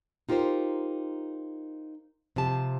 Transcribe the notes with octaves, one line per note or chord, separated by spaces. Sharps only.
D#4 F4 G4 A#4 C5
C3 F3 G4 A5